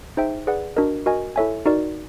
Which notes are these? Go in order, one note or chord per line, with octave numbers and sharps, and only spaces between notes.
D#4 G#4 C5 E5 G5
G#4 B4 D5 F#5
D4 F#4 A#4 D#5
F#4 A#4 D#5 G#5
E4 A4 C#5 E5 G#5
D#4 F#4 A#4 D5